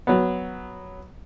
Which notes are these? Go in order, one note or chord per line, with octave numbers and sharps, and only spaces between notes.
F#3 B3